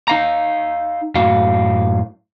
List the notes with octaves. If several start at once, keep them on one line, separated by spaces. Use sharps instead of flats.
D#4 F5 A#5
F#2 A2 F#4 F5